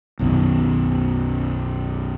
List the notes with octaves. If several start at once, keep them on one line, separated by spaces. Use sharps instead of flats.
B1 F#2 D#3